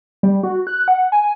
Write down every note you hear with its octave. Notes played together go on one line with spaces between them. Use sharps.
G3
F#4
F#6
F#5
G#5